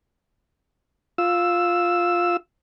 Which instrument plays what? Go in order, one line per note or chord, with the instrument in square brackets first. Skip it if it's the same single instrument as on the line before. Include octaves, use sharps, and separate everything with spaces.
[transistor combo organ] F4 E6